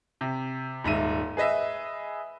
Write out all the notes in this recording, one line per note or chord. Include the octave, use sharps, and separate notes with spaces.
C3
D#1 G#2 E5 D#7
G#4 B4 D#5 E5